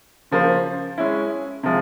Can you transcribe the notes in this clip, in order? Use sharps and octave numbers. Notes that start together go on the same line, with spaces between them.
C#3 F3 A#3 F4 C5
G#3 C#4 E4
C3 F3 G#3